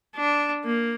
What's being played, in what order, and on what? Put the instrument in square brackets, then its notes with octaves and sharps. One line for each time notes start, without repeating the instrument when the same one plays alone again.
[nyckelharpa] D4
A#3